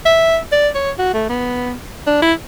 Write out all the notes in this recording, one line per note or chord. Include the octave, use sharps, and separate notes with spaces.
E5
D5
C#5
F#4
A3
B3
D4
E4